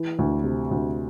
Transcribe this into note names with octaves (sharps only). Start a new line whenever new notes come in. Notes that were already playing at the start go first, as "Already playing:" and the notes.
Already playing: E3
D2
C3
D2